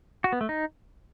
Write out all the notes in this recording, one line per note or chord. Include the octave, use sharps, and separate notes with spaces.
F#4
B3
A3
D#4